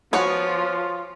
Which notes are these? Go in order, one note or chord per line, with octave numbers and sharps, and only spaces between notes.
F3 B3 F4 F#4 C#5 G#5